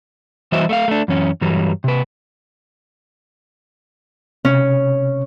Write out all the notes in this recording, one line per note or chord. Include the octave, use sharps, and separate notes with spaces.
E3 G3 F#4 C5 D#5 E5
A3 E5 F5
A3 D4
F#2 E3 C#4
G2 E3 F#3 G3
C3 B4
C3 C#4